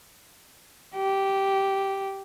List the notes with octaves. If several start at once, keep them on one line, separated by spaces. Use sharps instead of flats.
G4